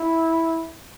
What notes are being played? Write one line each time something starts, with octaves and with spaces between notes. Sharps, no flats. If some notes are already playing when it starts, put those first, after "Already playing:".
Already playing: E4